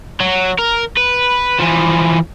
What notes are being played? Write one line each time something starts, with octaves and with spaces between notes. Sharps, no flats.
F#3
A#4
B4
E3 F3